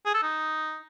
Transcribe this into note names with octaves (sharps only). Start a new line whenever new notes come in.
G#4
A4
D#4